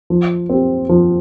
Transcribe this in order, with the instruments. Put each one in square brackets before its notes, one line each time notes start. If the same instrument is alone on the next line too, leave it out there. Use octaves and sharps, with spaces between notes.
[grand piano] F3
C4 G4
F3